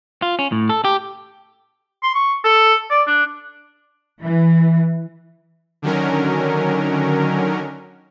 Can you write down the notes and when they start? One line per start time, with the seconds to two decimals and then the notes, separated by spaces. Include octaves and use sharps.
0.22 F4
0.39 C#4
0.52 A2
0.69 A4
0.85 G4
2.03 C6
2.15 C#6
2.45 A4
2.91 D5
3.07 D4
4.22 E3
5.82 D3 D#3 F#3 C#4 A#4